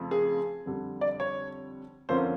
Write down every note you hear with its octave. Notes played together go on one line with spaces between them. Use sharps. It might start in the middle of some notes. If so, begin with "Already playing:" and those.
Already playing: F2 C#3 F3 A3 C4
G#4
F2 D3 G3
D5
C#5
F2 D3 F3 A#3 C#4 C5